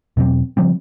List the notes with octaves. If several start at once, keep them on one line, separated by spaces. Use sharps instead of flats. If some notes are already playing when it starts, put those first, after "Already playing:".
E2 B2 F#3 C4
C#3 F3 G3 C4